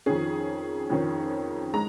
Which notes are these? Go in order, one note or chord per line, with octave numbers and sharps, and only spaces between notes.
F2 D#3 C#4 G#4
F2 D#3 C#4
G#3 A#5